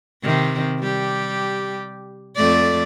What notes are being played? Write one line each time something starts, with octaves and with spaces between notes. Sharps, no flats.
C3 D#3 C4
G3 G4
F2 A3 D5